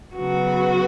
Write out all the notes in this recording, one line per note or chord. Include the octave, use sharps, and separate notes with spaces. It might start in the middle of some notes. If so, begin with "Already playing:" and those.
C#3 F#3 B3 F#4